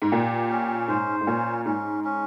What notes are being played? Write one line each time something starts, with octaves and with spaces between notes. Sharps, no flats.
G#2
A#2 G4
C#4
G#2 C5
G#2
A#2 C#4
G#2 C#4
C#4